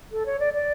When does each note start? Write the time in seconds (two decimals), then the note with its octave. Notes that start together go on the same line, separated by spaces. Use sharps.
0.12 A4
0.26 C#5
0.39 D5
0.54 D5